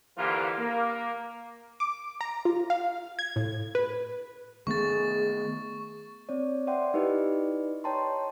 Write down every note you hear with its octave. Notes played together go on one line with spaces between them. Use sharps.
D3 E3 F3 A#3 F4 G4
A#3
D6
A#5
F4
F5
G#6
A2
B4
D#3 A3 B3 G#4 C#6 A6
C4 C#5 D5
C5 D5 E5 F#5 G5 C6
D#4 E4 G4 B4 D5 D#5
C#5 D#5 G5 A5 A#5 C6